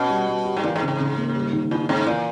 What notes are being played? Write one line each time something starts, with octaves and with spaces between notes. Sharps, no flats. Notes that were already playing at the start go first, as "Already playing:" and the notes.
Already playing: B2 C#4
G3
G3
G4
G#2
A#2 E3
G#2
C#3
G#2
C#3
A#3
G3
D#3
G2 E4
G#2 C#4
A#2 E3